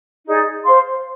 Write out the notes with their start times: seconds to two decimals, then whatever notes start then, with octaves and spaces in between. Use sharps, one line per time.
0.25 D#4 G#4 D5
0.63 C5 F5 C6